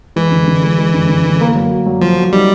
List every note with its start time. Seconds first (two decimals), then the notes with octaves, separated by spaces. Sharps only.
0.16 E3 G#3
0.32 D3
0.47 D3
0.63 G#3
0.78 G#3
0.94 D3
1.09 D3
1.24 D3
1.41 A#3
1.56 F#3
1.71 F#4
1.86 F#3
2.01 F3 F#3
2.17 F#4
2.33 G3 D#4